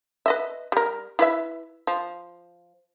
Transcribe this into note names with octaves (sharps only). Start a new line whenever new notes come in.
B4 D#5 E5
G3 A#4
E4 B4 E5
F3